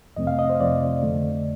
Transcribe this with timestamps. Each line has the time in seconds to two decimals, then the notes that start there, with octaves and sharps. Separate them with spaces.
0.17 F2 C3 F3 A3 C4 D#5
0.27 F5
0.39 D#5
0.50 C5
0.60 F2 C3 F3 A3 C4 D5
1.03 F2 D3 A3